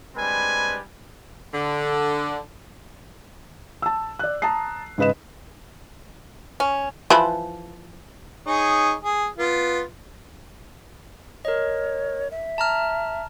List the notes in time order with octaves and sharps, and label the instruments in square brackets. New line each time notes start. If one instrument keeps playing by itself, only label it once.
[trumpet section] G3 G#3 C4 D4 B4 G#5
[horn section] D3
[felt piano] A5 E6
D5 F#6
A5 A#5 D#6 C7
G#2 C#3 B4 D#5 E7
[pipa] C#4
[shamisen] E3 F3 B4
[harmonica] D#4 G#4 C#5
G#4
B3 F4
[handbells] A#4 D#5 [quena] C#5
[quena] E5
[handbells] A5 A#5 F6